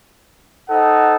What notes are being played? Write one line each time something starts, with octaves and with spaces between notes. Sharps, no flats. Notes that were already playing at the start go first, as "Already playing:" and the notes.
D#4 A4 C5 F#5